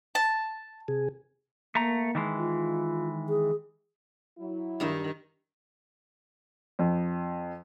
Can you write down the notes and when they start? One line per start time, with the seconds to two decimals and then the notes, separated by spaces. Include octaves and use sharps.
0.15 A5
0.88 C3 G#4
1.75 A3 A#3 A#5
2.15 D#3 E3 G#3
2.37 F4
3.29 G#4
4.39 F#3 E4
4.80 G2 D#3 D#4 E5
6.79 F2